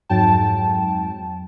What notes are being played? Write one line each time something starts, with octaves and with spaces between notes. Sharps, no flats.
F2 G#2 F#3 G5 A5